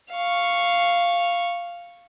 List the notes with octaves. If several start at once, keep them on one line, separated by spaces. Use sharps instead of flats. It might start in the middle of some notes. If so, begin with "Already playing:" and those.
F5 C#6